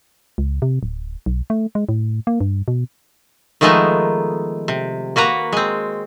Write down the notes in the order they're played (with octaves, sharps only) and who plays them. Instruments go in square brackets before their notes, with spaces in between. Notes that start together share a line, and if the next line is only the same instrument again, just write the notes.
[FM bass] C#2
C3
D1
B1
A3
G#3
A2
A#3
G2
B2
[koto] D#3 F3 G#3 A3 B3 D#4
C3
A#3 F#4 B4 A#5
G#3 C4